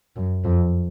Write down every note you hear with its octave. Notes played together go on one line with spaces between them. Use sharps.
F#2
F2